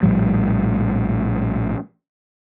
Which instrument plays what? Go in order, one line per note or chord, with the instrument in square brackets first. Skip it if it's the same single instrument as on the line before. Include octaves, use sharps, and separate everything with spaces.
[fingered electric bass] A#1 A2 F3 G3